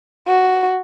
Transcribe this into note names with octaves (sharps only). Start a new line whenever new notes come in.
F#4